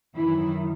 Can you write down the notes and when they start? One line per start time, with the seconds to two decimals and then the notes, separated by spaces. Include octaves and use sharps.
0.15 F#2 D#3 E3 E4